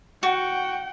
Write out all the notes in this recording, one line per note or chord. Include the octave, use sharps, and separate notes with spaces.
F#4 F#5 G5